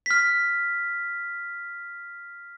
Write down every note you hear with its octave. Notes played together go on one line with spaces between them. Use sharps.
F6 B6